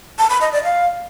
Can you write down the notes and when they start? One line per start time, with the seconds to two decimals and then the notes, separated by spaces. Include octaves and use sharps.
0.18 A5
0.30 B5
0.41 D#5
0.52 D5
0.64 F5